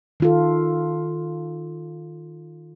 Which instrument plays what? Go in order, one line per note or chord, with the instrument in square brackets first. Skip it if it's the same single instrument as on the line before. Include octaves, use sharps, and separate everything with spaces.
[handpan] D#3 F4 A4